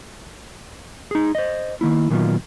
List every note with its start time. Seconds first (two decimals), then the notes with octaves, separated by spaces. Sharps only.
1.11 D#4 G#4
1.35 C5 D#5
1.81 D#3 A#3 E4
2.10 A#2 D#3 F#3 B3 F4